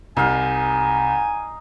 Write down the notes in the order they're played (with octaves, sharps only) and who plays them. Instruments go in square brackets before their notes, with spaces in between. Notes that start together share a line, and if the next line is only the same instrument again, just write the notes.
[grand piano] C2 [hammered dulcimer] D#4 F5 [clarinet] G#5